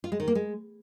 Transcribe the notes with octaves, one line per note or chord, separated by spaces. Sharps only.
F4
G#3
D#3
A#3
G#3